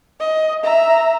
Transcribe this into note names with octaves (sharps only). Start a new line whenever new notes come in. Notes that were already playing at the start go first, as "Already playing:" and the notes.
D#5
E5 A#5